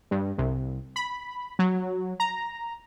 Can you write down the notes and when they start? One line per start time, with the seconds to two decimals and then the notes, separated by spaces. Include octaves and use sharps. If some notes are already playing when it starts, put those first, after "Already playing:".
0.11 G2
0.38 C2
0.96 B5
1.59 F#3
2.20 A#5